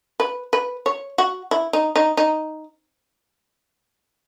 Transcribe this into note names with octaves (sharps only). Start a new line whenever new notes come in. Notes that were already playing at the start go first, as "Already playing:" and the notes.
B4
B4
C#5
F#4
E4
D#4
D#4
D#4